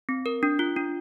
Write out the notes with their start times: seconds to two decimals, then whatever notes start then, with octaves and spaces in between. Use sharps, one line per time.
0.09 C4
0.26 A#4
0.43 D4
0.59 F4
0.76 D4